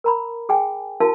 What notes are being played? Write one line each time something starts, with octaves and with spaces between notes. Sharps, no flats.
A#4 A#5 B5
G#4 G5 G#5
E4 F#4 A#4 F5 A5